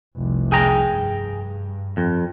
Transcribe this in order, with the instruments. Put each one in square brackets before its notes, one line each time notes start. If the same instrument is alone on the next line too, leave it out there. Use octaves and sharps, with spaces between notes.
[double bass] F1 C2
[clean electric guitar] G#4 G5 A#5
[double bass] G2
[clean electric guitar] F2